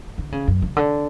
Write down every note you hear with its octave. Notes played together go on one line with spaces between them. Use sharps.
D3
C#3
F#2
C#3
D3